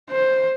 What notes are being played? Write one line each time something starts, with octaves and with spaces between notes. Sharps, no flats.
C5